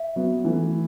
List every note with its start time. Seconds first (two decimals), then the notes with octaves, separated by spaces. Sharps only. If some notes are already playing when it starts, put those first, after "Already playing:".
Already playing: E5
0.16 F#3 B3
0.45 E3 A3